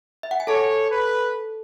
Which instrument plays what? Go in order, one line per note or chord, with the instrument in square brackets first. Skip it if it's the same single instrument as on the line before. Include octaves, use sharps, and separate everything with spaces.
[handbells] E5
F#5
G#5
[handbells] A4 A5 [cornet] C#5
[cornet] B4